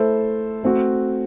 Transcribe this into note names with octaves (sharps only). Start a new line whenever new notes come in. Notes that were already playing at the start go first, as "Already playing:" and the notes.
Already playing: A3 E4 A4 C5
A3 C4 F#4